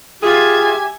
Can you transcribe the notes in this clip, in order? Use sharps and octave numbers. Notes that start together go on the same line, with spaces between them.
F4 G4 G#4 E5 G#5